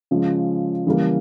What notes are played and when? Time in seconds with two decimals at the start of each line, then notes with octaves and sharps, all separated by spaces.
0.11 C#3 F3 G#3
0.86 C#3 E3 G3 A#3